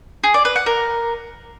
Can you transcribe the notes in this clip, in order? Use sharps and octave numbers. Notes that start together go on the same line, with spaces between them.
G#4
D5
B4
F#5
A#4